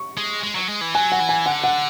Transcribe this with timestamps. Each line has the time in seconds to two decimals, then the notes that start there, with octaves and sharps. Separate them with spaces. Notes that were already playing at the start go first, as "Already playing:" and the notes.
Already playing: C#6
0.17 G#3
0.43 G#3
0.55 F#3
0.69 G#3
0.81 E3
0.94 F#3 G#5
1.12 F#5
1.20 E3
1.29 G#5
1.46 D3 F#5
1.64 F#5